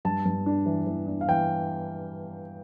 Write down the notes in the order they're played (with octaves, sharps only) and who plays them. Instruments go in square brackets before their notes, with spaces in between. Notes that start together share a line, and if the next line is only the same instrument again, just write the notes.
[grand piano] G2 A5
G2
D4
E3
E3
D4
F5
E3 G5